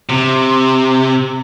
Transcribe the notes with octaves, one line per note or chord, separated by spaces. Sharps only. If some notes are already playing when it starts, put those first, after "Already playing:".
C3